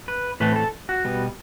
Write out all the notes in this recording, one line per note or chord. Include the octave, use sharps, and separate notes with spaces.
B4
A2 E3 A3 C4 B4
A4
F#4
B2 G3 B3